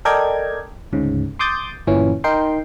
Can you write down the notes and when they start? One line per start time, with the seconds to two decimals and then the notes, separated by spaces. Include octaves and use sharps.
0.05 A4 A#4 D5 D#5 G5 G#6
0.92 D2 G#2 C#3
1.39 C6 D6 D#6 G6 A6
1.87 G1 A#2 E3 C#4
2.24 D#4 A#4 G5 C6